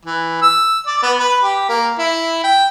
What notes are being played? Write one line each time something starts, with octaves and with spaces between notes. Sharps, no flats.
E3
E6
D5
B3
B4
G4
A#3
E4
G5